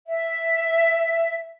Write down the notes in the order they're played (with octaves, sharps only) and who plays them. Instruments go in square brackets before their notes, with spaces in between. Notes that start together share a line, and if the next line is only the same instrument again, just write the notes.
[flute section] E5